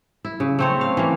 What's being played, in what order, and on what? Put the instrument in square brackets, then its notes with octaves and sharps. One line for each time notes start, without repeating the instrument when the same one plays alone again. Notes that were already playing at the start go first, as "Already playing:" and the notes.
[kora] E4
C#3
A3 C4 C#5
F5
E3 A#3